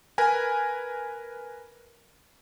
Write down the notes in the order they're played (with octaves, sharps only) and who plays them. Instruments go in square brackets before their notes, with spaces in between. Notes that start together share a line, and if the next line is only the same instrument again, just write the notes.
[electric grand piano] A#4 B4 G#5